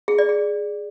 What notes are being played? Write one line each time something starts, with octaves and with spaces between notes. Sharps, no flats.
G#4
D5
G#4